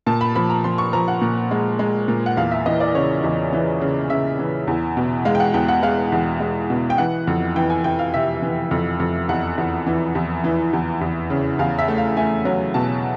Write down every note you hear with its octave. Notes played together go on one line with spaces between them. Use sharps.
A#2 A5
B5
F3 B5
A#5
F3 C6
C#6
F3 A#5
F#5
A#2
G#3
G#3
A#2
F#5
E2 F5
E5
E3 D#5
D5
C#3 C#5
E2
E3
C#3
C#3 E5
E3
E2
B2
G#3 F5
G5
F#5
E2 G5
F#5
G#3 F5
E2
G#3
B2
G5
E3 F#5
F2
E3 G5
G#5
E3 G5
F5
C3 E5
E3
F2
F2
E2 F#5
E2
E3
E2
E3
E2
E2
C#3
E2 F5
E5
A3
F5
A3 G#5
F#3
B2 A5